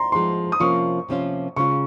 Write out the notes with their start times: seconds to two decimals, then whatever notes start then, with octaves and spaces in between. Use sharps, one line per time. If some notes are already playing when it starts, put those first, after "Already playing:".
Already playing: A#5 C6
0.12 F3 G#3 D#4 C6
0.52 D#6
0.60 C3 F3 A#3 C#4 F4 C#6
1.09 C3 F3 A#3 C#4 F4
1.56 C#3 G#3 C#4 F4 C#6